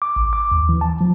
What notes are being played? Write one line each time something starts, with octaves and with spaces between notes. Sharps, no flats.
D6
A1
D6
D#2
E3
A5
F3